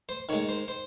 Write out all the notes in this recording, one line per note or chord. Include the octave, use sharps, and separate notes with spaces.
C5
D#3 G#3 C#5
C5
C5